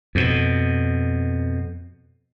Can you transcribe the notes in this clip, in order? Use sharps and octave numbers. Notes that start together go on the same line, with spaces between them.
F2 B2